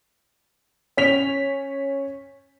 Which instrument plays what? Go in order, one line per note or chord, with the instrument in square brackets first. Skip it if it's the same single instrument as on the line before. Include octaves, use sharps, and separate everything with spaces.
[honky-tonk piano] C#4 B6 F7